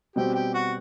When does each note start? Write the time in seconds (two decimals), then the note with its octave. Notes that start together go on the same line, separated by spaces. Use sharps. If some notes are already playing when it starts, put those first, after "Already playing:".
0.16 B2 G3 C4 G4
0.34 G4
0.54 F#4